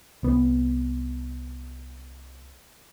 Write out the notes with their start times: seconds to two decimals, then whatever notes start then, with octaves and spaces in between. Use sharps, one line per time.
0.23 C2 B3